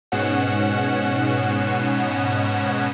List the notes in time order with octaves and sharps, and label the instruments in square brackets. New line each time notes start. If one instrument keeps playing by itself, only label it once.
[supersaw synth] G#2 B2 C#4 F#5 E7